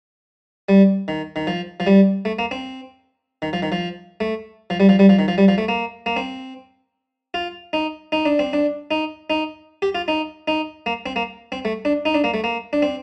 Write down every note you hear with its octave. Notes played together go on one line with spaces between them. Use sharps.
G3
D#3
D#3
F3
F3
G3
A3
A#3
C4
D#3
F3
D#3
F3
A3
F3
G3
F3
G3
F3
D#3
F3
G3
F3
A3
A#3
A#3
C4
F4
D#4
D#4
D4
C4
D4
D#4
D#4
G4
F4
D#4
D#4
A#3
C4
A#3
C4
A3
D4
D#4
D4
A#3
A3
A#3
D4
C4